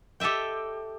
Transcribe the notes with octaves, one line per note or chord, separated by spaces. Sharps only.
G4 A4 D#5 E5 G5